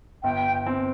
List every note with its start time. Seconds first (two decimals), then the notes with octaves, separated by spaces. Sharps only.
0.24 G1 G5
0.66 C4